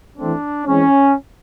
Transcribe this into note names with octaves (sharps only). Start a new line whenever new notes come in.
E3 A3 C4 D4
E3 G#3 C4 C#4